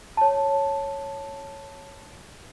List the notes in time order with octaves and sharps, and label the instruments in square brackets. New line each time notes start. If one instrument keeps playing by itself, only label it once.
[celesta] C#5 A5